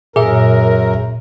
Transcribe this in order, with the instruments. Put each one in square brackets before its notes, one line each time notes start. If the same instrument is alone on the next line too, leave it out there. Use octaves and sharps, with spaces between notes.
[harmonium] F#2 A#4 [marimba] A#2 [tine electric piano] G#4 E5